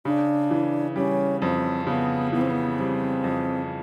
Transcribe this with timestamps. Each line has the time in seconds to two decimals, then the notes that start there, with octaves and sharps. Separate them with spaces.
0.05 C#3 D4
0.51 E3
0.96 G3 C#4
1.41 F2 C4
1.87 C#3 B3
2.33 E3 B3
2.41 C4
2.50 B3
2.78 G3 C4
3.24 F2